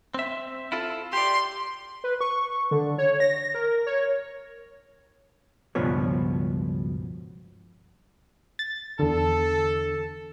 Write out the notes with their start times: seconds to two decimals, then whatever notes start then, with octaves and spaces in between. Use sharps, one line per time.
0.14 C4 E5
0.72 E4 F4 A4
1.13 G4 D5 C6
2.04 B4
2.21 C#6
2.71 D3
2.98 C#5
3.20 A#6
3.54 A#4
3.86 C#5
5.75 C#2 G2 B2 F3 B3 C#5
8.59 A6
8.99 E2 D3 A4